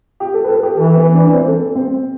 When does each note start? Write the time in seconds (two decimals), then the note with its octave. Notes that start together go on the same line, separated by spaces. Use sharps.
0.20 G4
0.34 A4
0.44 B4
0.48 A4
0.63 G4
0.77 E3 A4
0.96 B3 B4
1.14 D4 D5
1.34 C4 C5
1.48 A4
1.75 C4 C5